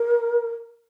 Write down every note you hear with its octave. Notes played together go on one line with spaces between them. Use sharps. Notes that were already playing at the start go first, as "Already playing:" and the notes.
Already playing: A#4